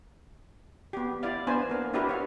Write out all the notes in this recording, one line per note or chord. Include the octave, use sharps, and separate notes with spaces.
B3 G4
E4 D5 F5
B3 D4 B4 C5 G#5
A#3 A#4
D4 E4 F#4 G4 A#4 B4
C#5 F5